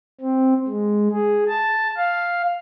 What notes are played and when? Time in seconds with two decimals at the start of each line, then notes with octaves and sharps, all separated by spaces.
0.21 C4
0.68 G#3
1.12 G#4
1.48 A5
1.97 F5